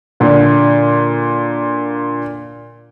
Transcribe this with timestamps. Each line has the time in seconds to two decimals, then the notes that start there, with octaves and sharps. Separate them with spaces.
0.20 A#2 D3